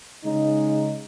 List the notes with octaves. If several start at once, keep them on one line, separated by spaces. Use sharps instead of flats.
C#3 G#3 D#4